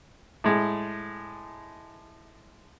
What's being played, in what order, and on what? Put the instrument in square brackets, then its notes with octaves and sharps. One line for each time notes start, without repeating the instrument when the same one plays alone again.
[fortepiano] A2 G#3